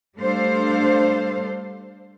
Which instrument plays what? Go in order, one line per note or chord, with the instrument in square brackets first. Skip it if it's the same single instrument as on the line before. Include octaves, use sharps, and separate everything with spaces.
[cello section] G3 A3 D4 A4 C5 F5